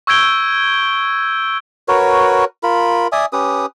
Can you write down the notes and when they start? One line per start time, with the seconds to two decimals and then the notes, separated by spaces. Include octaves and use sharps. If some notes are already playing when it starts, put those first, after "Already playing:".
0.07 C#6 E6 G6 G#6 D7 G7
1.88 F#4 A#4 B4 C#5
2.63 F4 A#4 B5
3.12 D5 E5 G#5 D#6
3.33 C#4 G4 B4 D#6